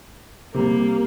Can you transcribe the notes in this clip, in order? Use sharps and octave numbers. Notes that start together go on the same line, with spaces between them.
C3 G3 A#3